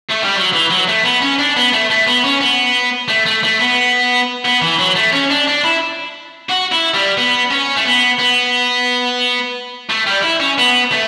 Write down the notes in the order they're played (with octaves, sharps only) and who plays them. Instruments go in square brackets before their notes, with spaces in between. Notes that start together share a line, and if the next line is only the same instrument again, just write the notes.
[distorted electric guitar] A3
G3
F#3
E3
F#3
A3
B3
C#4
D4
B3
A3
A3
B3
C#4
B3
A3
A3
A3
B3
B3
E3
F#3
A3
C#4
D4
D4
E4
F#4
E4
G3
B3
C#4
A3
B3
B3
A3
G3
E4
C#4
B3
A3